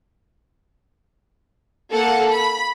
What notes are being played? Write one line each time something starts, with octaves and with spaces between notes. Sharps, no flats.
A#3 A4 F#5
B5